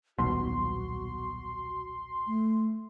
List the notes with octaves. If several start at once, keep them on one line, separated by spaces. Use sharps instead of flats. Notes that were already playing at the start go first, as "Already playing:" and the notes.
D#1 B1 B2 F#4 C6
A3